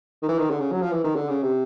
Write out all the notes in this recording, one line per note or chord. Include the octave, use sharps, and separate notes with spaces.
D#3
E3
D#3
D3
C#3
F#3
F3
E3
D#3
D3
C#3
C3